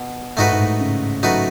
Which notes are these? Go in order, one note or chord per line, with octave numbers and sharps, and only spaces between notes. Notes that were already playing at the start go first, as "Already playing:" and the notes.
Already playing: B2
G#2 A3 D#4 F#4 B4
G#2
A2
C#3
F#3 A3 D#4 F#4 B4